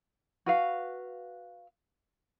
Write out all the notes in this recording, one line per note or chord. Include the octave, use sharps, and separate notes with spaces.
F#4 B4 F5